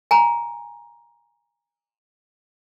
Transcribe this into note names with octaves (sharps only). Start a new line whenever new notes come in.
G#5 A#5